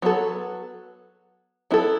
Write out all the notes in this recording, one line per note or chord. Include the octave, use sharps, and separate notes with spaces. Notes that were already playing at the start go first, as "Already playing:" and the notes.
F#3 B3 F#4 A4
F#3 B3 E4 A4